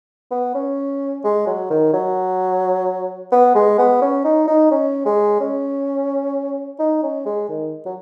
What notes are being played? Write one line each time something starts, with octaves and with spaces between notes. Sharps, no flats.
B3
C#4
G#3
F#3
D#3
F#3
B3
G#3
B3
C#4
D#4
D#4
C#4
G#3
C#4
D#4
C#4
G#3
D#3
F#3